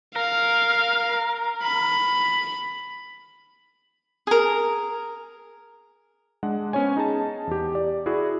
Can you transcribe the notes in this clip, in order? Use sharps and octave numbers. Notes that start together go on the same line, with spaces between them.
A#4 F5
B5
G#4 A#4
G#3 D4 F#5
B3 C#4 C5 C#5 G#5
D#4 G#4 A5
E2 G4
D5
E4 F#4 G#4 D5